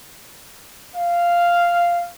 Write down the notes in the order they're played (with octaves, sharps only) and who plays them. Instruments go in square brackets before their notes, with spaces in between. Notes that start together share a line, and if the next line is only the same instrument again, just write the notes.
[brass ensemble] F5